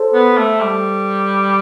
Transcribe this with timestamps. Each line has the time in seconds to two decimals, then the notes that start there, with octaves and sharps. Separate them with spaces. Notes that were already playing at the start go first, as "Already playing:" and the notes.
Already playing: A4 C5
0.14 B3
0.37 A3
0.61 G3